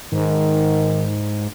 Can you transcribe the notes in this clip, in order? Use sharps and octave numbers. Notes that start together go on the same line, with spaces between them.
G#2 D#3